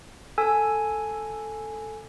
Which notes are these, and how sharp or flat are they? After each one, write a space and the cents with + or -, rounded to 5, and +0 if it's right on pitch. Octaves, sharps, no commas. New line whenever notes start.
A4 +5 G#5 +5 E6 +0